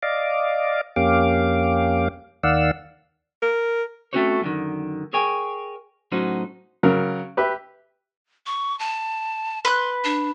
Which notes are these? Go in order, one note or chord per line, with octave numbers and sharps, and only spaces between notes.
D5 D#5 F5 D6
F2 A#3 C#4 G4 F5 D6
D#2 D#3 D5 F5 F#5 E6
A#4
A3 C4 C#4 F#4 C5 C#5
F#2 D3 D#3
G#4 A#4 C#5 G5 G#5
A2 F#3 C#4 D#4 F#4 C5
C#3 F#3 A#4
G4 B4 E5
C#6
A5
B4 C6 F#6
D4